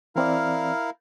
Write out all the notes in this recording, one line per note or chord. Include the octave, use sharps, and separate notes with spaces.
E3 C4 E4 A#4 D5 F5